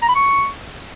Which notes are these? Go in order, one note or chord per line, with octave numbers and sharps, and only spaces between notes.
A#5
B5
C#6